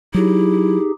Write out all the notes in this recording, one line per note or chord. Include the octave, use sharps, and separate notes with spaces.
F#3 D#4 E4 G4 G#4